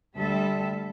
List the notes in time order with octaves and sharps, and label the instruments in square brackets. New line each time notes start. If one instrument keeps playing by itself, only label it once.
[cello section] D2 G3 A4 E5